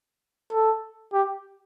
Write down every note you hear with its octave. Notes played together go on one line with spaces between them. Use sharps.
A4
G4